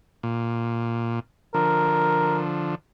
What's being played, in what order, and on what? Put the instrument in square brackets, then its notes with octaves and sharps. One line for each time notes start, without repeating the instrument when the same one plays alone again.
[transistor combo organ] A#2
[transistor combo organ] D3 F3 [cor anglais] A#4